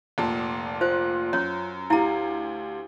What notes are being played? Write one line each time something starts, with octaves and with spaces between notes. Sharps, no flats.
F1 A#2 A5
F4 C5 F#6
F#2 C#5
D2 E4 G4 F5 A#5